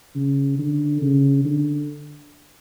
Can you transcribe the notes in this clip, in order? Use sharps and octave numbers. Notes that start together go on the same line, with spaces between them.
C#3
D3
C#3
D3